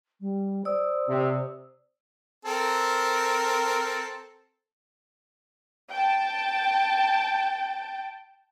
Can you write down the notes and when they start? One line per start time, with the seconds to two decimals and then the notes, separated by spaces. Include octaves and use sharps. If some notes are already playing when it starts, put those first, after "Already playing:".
0.21 G3
0.65 C5 D5 D#6 E6
1.09 C3
2.45 C4 A4 A#4
5.90 G5 A5